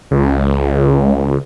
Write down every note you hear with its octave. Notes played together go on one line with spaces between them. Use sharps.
C#2